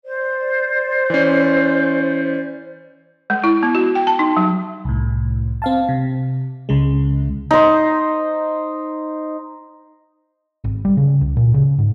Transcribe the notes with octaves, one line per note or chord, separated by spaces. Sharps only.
C5 D5
E3 C#4
G#3
E4
B3
F#4
G5
A5
D#4
F#3
C2 A2
C4 F5 A5
C3
C#2 C#3 G#3
D#4 C5
G#1
G3
C#3
C#2
A#2
C#3
G#2